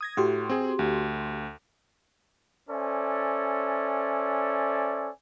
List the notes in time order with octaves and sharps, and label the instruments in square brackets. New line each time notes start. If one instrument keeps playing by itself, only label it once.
[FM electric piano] D#6 G#6 A#6
[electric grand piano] A2 [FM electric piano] F#4 G4 C6
[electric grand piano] C4 G#4
D2
[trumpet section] C#4 A4 C5 D5 E5 G#5